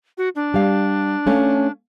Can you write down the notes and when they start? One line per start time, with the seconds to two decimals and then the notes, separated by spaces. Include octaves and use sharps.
0.18 F#4
0.35 D4
0.54 G3 F5
1.26 A3 C#4 F5